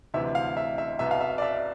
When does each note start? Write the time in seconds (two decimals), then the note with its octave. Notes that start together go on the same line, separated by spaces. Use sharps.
0.14 D2 C3 E3 E5
0.35 F5
0.57 E5
0.78 E5
0.99 C2 B2 E5
1.11 F5
1.21 E5
1.38 D5
1.42 E5